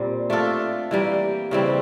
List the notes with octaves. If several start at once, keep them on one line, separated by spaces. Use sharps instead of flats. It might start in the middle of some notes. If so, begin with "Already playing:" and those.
Already playing: A#2 G3 C4
A3 D4 F4 A4
E3 G3 A#3
C#3 E3 G3 C4